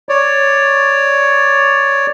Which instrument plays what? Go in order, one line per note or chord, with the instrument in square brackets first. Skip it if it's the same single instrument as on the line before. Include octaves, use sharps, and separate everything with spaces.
[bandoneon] C#5 D5